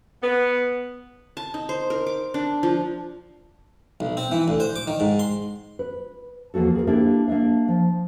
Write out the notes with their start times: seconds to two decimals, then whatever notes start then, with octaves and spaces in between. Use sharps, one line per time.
0.23 B3
1.37 A5
1.54 D#4
1.69 C5
1.90 A#4
2.07 D6
2.34 D4
2.63 F3
4.00 B1
4.17 C4
4.32 E3
4.48 D2
4.60 C5
4.76 D6
4.87 D#3
5.00 G#2
5.19 C6
5.79 B4
6.54 E2 F3 A#3 F#4 A4
6.75 G#4 A#4
6.87 A#3 D4 E4 G4 A4
7.28 A#3 D4 E5 F5
7.68 F3